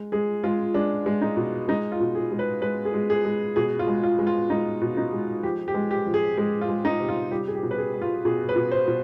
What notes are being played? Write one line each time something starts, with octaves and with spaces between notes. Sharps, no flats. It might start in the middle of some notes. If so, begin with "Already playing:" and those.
Already playing: G#3
G#3 G#4
G#3 F4
G#3 D4
G#3
D#4
B2
G#3 D#4
F4
B2
G#4
G#3
B4
G#3 B4
G#4
G#3
G#4
G#3
B2 G#4
F4
G#3
F4
G#3
F4
G#3 D#4
B2
D#4
G#3
F3 G4
G4
G#3
G4
F3
G#4
G#3 G#4
F4
G#3
D#4
C3
F4
G3 G4
G#4
G4
B2
B4
G#4
G3
F4
B2 G#4
B4
B2
C5
B2